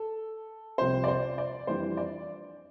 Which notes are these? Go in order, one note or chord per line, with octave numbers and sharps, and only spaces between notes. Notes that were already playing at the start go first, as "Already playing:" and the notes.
Already playing: A4
C2 C3 F3 C4 C5
D5
C5
D5
F2 E3 G3 D4 C5
D5